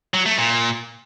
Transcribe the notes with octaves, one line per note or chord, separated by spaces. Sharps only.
F#3
A3
A#2